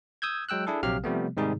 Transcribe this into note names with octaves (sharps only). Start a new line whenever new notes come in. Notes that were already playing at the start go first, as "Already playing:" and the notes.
D#6 E6 G6 G#6
F#3 G#3 G5 E6 F#6
D4 E4 G#4 A4
A#1 C3 F#3 G4 F5 F6
C3 F3 G3 A3 B3
G#2 C3 D#3 G3 D#4 G#4